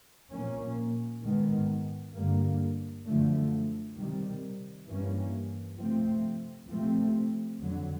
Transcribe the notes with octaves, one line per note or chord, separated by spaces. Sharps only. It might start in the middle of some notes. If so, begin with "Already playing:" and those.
A#2 F3 A#3 C#4
G#2 D#3 G#3 B3
G2 D3 G3 A#3
F#2 D3 F3 A3
C3 D#3 G3
G2 E3 G3 A#3 C#4
C3 F3 A3 C4
C3 F3 A3 C4
F2 D3 F#3